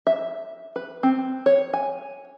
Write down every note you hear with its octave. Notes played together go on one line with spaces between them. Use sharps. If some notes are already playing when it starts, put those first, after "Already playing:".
E5
B4
C4
C#5
G#5